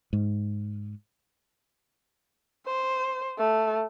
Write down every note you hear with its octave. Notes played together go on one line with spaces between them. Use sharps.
G#2
C5
A3